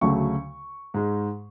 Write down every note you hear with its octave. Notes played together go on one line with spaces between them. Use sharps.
D2 C#3 F#3 A3 C#6
G#2 G#3